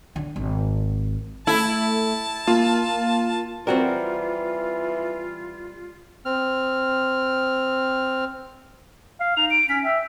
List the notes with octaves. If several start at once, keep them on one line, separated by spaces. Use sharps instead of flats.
D3
G#1
A3 E4 A5
A#3 F4
E3 G3 C4 F4 F#4 A#4
C4 F6
F5
D#4 F7
D7
C#4 B6
E5 G5